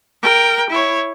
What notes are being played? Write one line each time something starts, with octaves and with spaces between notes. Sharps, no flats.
A#4 G5
E4 C#5